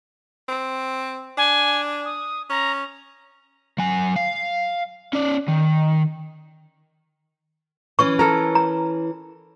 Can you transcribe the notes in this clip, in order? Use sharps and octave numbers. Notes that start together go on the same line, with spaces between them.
C4
D4 G#5
D#6
C#4 A#5
F#3 G#5
F5
C#4 D5
D#3
E3 C#4 C#6
A4 A#4
A#5